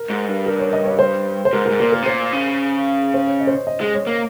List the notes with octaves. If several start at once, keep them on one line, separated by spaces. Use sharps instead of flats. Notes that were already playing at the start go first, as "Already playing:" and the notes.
Already playing: A#4
G#2
G2
A#4
C#5
D#5
C#5
C5
C5
G#2 A#4
A#4
G#2
A#2 A#4
A#4
C3
A#2 C5
C#3
C5
C#5
D#5
C5
C#5
D#5
G#3 D#5
C#5
A#3 C#5